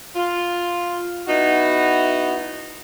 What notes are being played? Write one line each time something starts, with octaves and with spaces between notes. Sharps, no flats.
F4
B3 D#4 E4 F#4